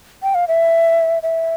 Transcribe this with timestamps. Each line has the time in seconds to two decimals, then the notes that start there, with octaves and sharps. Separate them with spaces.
0.23 G5
0.35 F5
0.48 E5
1.23 E5